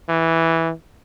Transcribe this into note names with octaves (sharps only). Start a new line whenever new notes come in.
E3